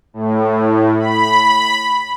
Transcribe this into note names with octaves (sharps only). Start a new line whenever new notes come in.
A2
B5